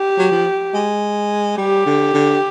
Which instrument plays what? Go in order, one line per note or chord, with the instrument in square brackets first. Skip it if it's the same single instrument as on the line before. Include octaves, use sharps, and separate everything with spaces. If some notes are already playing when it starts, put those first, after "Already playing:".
Already playing: [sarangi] G4
[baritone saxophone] F#3
F3
G#3
[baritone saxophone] G3 [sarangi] G4
[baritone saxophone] D3
D3